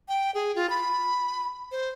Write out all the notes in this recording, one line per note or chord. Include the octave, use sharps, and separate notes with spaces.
G5
G#4
F4
B5
C5